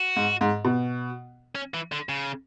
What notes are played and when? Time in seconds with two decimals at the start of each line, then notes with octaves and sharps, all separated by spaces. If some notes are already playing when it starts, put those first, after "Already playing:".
Already playing: F#4
0.16 G#2
0.41 G#2
0.65 B2
1.55 C#4
1.74 E3
1.92 D3
2.09 C#3